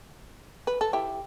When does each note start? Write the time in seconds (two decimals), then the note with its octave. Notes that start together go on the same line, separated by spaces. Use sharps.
0.67 B4
0.81 A4
0.93 E4 G4